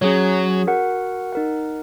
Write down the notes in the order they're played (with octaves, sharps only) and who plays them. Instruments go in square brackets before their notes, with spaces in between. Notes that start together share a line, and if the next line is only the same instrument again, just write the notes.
[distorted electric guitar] F#3 [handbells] C#4 G#4 C#5
[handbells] F#4 A#4 F#5
D#4 A#4 F#5